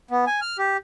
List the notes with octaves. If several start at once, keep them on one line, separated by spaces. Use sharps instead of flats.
B3
G#5
F6
G4